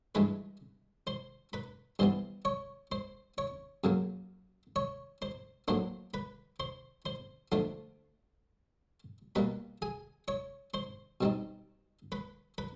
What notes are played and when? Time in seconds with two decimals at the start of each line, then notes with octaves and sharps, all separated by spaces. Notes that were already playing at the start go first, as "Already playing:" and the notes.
0.15 G2 E3 G#3 B4 B5
1.07 C5 C6
1.53 B4 B5
1.99 G2 E3 G3 B3 C5 C6
2.45 C#5 C#6
2.92 C5 C6
3.38 C#5 C#6
3.84 F#2 C#3 F#3 A#3
4.76 C#5 C#6
5.22 C5 C6
5.68 A2 F#3 A#3 D4 C5 C6
6.14 B4 B5
6.60 C5 C6
7.06 C5 C6
7.52 D3 F3 A3 D4 C5 C6
9.35 B2 G3 A#3 B4 B5
9.82 G#4 G#5
10.28 C#5 C#6
10.74 C5 C6
11.21 B2 G3 C4 D#4
12.12 B4 B5
12.58 B4 B5